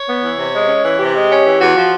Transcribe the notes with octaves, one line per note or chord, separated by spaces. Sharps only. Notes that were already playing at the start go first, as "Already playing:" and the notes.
Already playing: C#5
B3
E3
C3
G#3
C#4
E3
C3 G4
G#3
C#4
E3
E2 F#4
F3